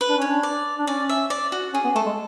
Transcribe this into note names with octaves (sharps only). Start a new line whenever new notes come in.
B4
D4
C#4
C#5
D4
D5
D4
C#4 D5
E5
D5
F#4
C#4 G#4
B3
A3 A4
G#3